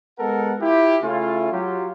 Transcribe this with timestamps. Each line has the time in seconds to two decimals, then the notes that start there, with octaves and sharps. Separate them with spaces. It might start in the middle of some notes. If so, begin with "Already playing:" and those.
0.19 G#3 B3 A4 A#4 F#5
0.60 E4 F4 G4
1.02 C#3 A3 C#4 E4 F4
1.52 F#3 F4 G4